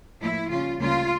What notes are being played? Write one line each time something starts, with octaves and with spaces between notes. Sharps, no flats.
A2 F3 A#3 E4
C#3 G3 C#4 F4
D2 C#3 G3 A#3 C#4 F4